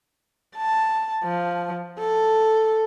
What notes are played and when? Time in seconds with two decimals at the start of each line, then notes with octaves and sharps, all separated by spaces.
0.56 A5
1.24 F3
1.99 A4